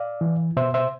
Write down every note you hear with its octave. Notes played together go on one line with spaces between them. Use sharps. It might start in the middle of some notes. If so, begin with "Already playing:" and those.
Already playing: D5 F5
E3
B2 C5 E5
C5 E5